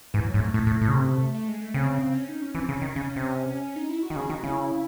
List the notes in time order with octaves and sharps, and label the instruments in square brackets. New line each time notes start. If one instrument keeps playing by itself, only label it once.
[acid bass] G#2 [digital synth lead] E3
[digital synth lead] F#3
[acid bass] G#2
[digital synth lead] A3
[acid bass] A2 [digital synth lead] A3
[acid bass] A2
A2
C#3
C3
[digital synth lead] A3
G#3
A3
[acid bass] C#3 [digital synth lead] C4
[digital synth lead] C#4
D#4
C#4
[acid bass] E3 [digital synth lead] C4
[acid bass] C#3
[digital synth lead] C#4
[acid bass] D#3
[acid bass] C#3 [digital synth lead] C#4
[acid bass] C3
[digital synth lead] D#4
E4
F#4
[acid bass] D#3
[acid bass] C#3 [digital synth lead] G#4
[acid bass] D#3 [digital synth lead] F#4
[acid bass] C#3 [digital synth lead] E4